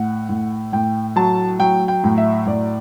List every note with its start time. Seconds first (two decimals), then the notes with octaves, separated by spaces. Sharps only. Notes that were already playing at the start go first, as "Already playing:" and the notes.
Already playing: A2 F#5
0.29 A2
0.73 A2 G5
1.16 F#3 A5
1.59 F#3 G5
1.88 G5
2.04 A2
2.18 E5
2.46 A2 D5